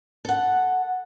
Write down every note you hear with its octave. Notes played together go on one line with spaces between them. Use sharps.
A4 F#5